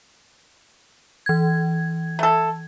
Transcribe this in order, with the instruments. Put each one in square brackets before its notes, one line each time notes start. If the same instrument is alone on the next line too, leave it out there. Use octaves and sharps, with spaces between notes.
[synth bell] E3 G#6
[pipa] A3 A4